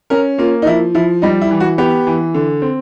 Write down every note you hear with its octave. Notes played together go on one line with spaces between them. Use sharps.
C#4 A#4
A#3 F4
D#4
F3 E4
F3 E4
G3 D#4
E4
E3
F#4
B3 G4
E3
D3
C4